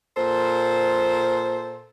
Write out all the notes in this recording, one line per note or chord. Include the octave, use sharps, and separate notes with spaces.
A#2 A4 C5